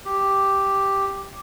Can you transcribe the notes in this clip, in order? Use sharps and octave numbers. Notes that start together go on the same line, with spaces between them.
G4